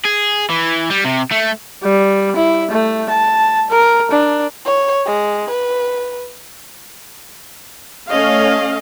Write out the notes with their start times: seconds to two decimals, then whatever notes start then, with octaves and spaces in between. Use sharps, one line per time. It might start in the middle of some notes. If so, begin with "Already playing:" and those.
0.05 G#4
0.50 E3
0.91 G3
1.05 C3
1.31 A3
1.84 G3
2.36 E4
2.71 A3
3.09 A5
3.70 A#4
4.11 D4
4.65 C#5
5.06 G#3
5.51 B4
8.11 A3 C#4 D#5 F5